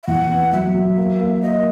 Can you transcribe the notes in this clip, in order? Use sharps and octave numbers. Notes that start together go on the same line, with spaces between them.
E5
E2 F#5
B3
F#3 E5
F#3
A#3
A#3
A#3 D#5